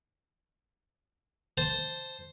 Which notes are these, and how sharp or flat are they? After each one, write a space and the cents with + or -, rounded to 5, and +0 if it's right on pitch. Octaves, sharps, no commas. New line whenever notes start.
C5 +0 A5 +0